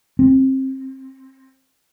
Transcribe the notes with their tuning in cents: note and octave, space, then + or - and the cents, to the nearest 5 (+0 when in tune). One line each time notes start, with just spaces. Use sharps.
C4 +25